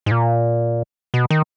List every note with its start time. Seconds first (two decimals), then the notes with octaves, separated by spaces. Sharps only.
0.06 G#2
0.11 A#2
1.14 B2
1.31 D#3